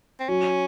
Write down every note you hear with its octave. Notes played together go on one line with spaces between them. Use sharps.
C4
F#3 C#4